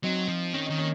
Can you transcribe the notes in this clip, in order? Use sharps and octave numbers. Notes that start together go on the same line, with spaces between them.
F#3 C4 D#4
F3
D#3 C#4
D#3 D#4
A#3 C#4